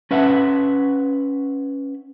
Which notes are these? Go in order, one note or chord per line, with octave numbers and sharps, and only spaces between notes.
C#4 B4 E5 F#5